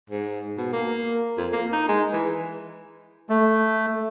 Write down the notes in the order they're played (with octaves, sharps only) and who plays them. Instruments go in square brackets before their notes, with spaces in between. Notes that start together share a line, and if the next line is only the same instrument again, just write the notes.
[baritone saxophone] G#2
B2
A#3
F2
A#3
D#4
G#3
E3
[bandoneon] A3